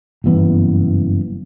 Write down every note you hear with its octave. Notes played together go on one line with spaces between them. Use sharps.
F#1 G2 E3 B3